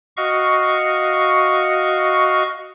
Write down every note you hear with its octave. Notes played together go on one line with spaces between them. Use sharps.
F#4 D#5 F5 C#6